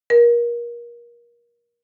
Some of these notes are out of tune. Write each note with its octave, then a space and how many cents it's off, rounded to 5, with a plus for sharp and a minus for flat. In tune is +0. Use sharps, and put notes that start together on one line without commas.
A#4 +30